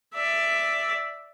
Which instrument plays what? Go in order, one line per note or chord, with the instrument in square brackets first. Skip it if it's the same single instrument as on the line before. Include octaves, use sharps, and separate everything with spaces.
[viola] D5 E5